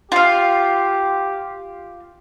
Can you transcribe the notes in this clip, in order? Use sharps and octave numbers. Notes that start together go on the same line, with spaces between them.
F4 G4 F5